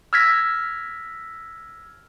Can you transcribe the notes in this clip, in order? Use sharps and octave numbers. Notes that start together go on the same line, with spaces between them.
E6 F6 G#6 A#6 B6